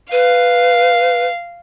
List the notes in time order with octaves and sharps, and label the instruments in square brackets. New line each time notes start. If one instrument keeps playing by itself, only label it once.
[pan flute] B4 [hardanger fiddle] F5